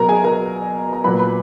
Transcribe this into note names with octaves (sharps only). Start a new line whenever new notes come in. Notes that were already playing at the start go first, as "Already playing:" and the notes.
Already playing: B2 F#3 A#4 A#5
G#4 G#5
A#4 A#5
A#5
A#2 F#3 B4 B5
B4 B5